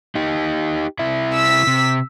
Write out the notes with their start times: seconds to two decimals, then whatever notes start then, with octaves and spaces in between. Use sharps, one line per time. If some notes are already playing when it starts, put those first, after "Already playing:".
0.15 D#4 G4
0.99 C3 E4 E5
1.34 E6 B6
1.67 C3